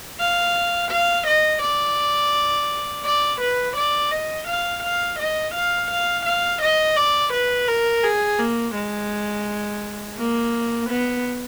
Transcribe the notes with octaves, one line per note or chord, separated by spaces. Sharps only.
F5
F5
D#5
D5
D5
B4
D5
D#5
F5
F5
D#5
F5
F5
F5
D#5
D5
B4
A#4
G#4
A#3
G#3
A#3
B3